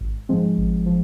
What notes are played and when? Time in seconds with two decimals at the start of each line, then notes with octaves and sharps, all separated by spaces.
0.01 G#1
0.29 G#2 F3 G#3 C4
0.58 G#1
0.86 F3